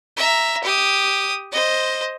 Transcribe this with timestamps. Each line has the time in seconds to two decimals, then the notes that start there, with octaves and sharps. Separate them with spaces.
0.17 E5 A#5
0.63 G4 D#6
1.52 C5 D#5